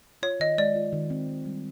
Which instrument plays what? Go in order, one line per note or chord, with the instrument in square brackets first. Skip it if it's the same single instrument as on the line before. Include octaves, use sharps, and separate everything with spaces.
[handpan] F4 [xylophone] C#5
[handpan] D#3 [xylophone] D#5
[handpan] G#3 [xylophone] D5
[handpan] F4
D#3
C4
D#3
G3